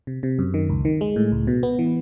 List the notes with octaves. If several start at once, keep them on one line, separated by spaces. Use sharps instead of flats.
C3
C3
F#2
D#3
C#2
D#3
G#3
A2
C#2
B2
B3
E3